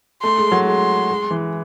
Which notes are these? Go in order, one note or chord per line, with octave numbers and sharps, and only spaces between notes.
A3 C6
G#3
F#3
G#3 C6
G#3
E3